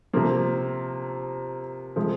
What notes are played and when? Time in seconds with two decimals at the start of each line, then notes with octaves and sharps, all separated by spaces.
0.13 C3 F3 A#3
1.96 C3 F3 G#3